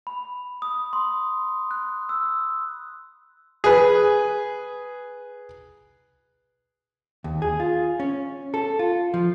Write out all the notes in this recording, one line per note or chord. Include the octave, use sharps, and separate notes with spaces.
B5
D#6
C6
F#6
E6
G#4 B4
D#2
G#4
F4
C#4
A4
F4
F3